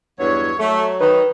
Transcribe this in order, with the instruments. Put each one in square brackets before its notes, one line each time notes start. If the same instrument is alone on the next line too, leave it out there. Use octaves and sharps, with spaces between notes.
[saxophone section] E2 G2 F#3 [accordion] C#5
[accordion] F#3 [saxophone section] A3
[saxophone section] D#3 D#4 [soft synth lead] B4